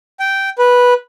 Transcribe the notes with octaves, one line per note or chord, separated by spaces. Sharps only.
G5
B4